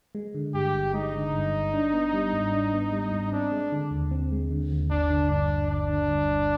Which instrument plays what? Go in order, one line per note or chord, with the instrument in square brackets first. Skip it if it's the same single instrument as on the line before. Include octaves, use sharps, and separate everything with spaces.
[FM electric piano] G#3
D3
[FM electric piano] G2 [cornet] G4
[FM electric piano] G1
[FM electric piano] G#3 [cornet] D#4
[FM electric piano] D3
G2
G1
D4
B3
G3
G#2
D4
B3
G3
G#2
[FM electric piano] C4 [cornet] D4
[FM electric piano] G#3
D3
D#2
C4
G#3
D3
D#2
[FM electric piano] G1 [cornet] D4
[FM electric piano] D3
[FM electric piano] G2 [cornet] D4
[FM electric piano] G1
[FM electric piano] G1 [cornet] D4
[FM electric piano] D3
G2
G1